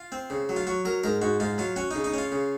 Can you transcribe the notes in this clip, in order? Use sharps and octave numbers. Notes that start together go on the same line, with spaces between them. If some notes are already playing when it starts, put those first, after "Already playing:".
Already playing: F4
C4
C#3
F#3
F4
F#3 F#4
F#3 A#4
G#2 A#4
G#2 F#4
G#2 F4
F#3 F4
C#4 F#4
C#3 D#4
D#4
C#4 F4
C#3